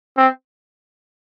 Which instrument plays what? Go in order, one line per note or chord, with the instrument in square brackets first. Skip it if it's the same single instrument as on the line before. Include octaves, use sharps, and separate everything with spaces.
[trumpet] C4